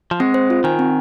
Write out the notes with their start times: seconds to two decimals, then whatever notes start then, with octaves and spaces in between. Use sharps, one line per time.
0.11 F3
0.20 G#3 C4
0.34 C5
0.50 F4
0.64 D#3 G#5
0.79 C4